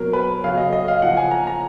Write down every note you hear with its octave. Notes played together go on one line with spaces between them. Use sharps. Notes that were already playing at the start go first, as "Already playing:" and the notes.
Already playing: B2 F#3 A#4
B4
C#3 F#3 F5
D#5
D#5
F5
C#3 F3 F#5
G#5
A#5
A#5